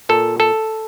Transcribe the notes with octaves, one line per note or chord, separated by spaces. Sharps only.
A#2 A4
A4